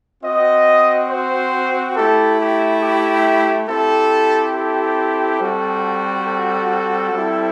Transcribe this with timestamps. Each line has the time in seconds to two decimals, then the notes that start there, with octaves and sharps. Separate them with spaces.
0.23 C4 F#4 D#5
1.10 C5
1.96 A3 E4 G4 A4
2.39 G4
2.82 G4
3.68 C4 E4 G4 A4
4.55 A4
5.41 G3 C4 F#4
6.27 A4
7.13 G3 C4 E4